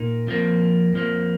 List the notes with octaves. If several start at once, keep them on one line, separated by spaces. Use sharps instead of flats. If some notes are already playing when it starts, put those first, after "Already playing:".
Already playing: A#2 A#3 D#4
F2 F3 A#3
F2 F3 A#3